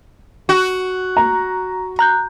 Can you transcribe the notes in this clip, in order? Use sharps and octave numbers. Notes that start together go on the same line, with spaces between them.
F#4
A#5
A#5 F#6 G6